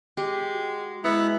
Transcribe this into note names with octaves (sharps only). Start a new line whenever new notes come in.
G#3 G4
F#4
G#3 B3 E4 A#5 B5